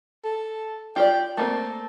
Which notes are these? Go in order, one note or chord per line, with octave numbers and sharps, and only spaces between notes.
A4
F4 G4 D5 G5
A3 A#3 C4 A5